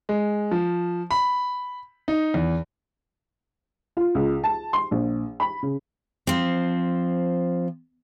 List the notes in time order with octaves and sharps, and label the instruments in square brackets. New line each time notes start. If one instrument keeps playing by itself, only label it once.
[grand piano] G#3
F3
B5
D#4
E2
[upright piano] F4
C#2
A5
C6
A#1
B5
C#3
[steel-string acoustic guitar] F3 C4